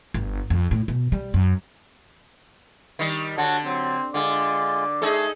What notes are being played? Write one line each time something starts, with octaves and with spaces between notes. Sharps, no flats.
G1
F2
A2
B2
G3
F#2
D#3 G3
D3 F#4 C#5 F#5 A5
F#3 C4
D3 G#3 F4 D5
A3 D#4 G#4 A4